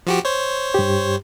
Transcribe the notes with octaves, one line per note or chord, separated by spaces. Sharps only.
F3 F#4 G4
C5 C#5
G2 G4